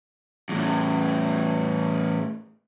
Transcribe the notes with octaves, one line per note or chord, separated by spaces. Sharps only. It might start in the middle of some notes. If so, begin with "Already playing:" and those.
E2 A2